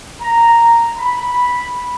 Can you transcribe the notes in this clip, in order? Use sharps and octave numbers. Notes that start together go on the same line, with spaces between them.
A#5
B5